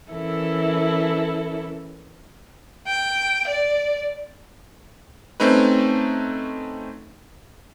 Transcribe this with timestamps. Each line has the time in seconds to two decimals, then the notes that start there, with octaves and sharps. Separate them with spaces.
0.10 E3 C#4 E4 A4 A#4
2.87 G5
3.48 D5
5.40 A3 C4 C#4 D#4 B4